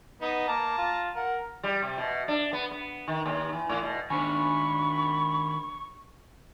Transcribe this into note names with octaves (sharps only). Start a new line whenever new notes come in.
B3 D#4
A#3 A5 A#5
F4
A#4 F#5
G3
C3
B2
D4
B3
B3
D#3
D#2
E3
A2
B2
D#3 D4 C5 G#5 B5 C#6